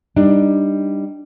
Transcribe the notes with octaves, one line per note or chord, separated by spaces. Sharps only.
G3 D4 D#4